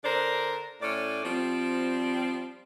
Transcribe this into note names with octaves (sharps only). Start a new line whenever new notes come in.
D3 A#4 C5 D5
A2 C#4 D5
F3 G3 C4